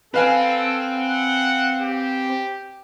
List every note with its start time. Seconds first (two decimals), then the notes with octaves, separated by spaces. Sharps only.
0.14 C4 A4 B4 F5 G#5
0.97 F#5
1.81 G4